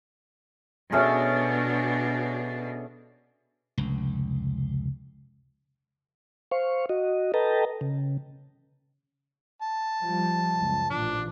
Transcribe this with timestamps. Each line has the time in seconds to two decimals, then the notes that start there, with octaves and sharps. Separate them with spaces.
0.92 B2 A3 C#4 D4 G#4
3.78 F1 C#2
6.52 C5 F5 C#6
6.89 F#4 D#5
7.34 A4 B4 D#5 G5 A5 A#5
7.81 C#3
9.62 A5
10.04 F3 G3
10.56 F#1 C#2
10.91 A1 A#2 F3 D4